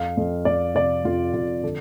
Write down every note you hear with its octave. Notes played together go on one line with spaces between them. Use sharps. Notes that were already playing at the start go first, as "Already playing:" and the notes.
Already playing: F2 F5
F2
F2 D5
C3 D5
F2 F4
F2 F4
D3 A4